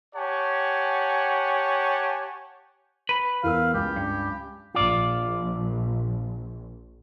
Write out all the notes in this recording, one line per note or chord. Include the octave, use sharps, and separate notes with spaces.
G4 C#5 F#5 G#5 A5
B4
E2 A#4 F5 E6
C#2 G4
G2
A#1 F4 D5